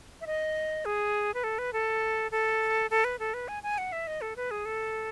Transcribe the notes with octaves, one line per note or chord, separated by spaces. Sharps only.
E5
D#5
G#4
B4
A4
B4
A4
A4
A4
B4
A4
B4
G#5
G#5
F#5
E5
D#5
A4
B4
G#4
A4